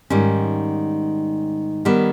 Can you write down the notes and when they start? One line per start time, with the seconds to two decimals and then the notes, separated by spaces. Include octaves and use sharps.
0.10 G#2 D#3 G3 C#4
1.85 D#3 G3 B3